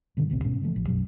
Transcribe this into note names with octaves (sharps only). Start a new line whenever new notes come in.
G2 B2 D3 D#3
A1 D2 B2 C4
G#2 B2 C#4
C#3 E3 F3 A3
A1 F3
B1 F#2 B2 F#3